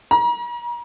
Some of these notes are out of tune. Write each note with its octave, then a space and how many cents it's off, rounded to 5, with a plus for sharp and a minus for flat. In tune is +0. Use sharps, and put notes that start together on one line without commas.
A#5 +40